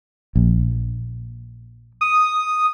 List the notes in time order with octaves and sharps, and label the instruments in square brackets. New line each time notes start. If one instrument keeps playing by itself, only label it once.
[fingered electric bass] A#1
[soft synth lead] D#6